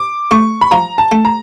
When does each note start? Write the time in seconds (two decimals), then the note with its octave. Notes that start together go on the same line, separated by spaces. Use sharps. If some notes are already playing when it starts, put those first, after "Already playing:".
Already playing: D6
0.31 A3 C#6
0.61 B5
0.71 F3 A#5
0.98 A5
1.12 A3
1.25 A#5